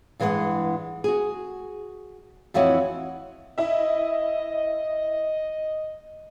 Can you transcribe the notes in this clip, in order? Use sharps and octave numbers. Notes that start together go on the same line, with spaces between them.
G2 E3 G#3 G#4 F#5
F#4 G#4
F2 E3 E4 F#4 C#5 D#5
E4 D#5 E5